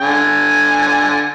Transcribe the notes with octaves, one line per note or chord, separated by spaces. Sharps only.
D3 G#5